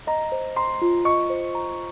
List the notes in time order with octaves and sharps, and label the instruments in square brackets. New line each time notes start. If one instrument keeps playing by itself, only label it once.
[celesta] D#5 [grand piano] A#5
[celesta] C5
[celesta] A#5 [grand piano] C6
[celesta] F4
[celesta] D#5 [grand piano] C#6
[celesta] C5
A#5